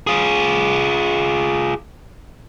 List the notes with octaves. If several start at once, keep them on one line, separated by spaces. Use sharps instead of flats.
F4 G#4